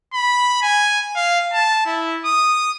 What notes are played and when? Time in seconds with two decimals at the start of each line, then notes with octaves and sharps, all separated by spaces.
0.13 B5
0.62 G#5
1.16 F5
1.53 A5
1.86 E4
2.25 D#6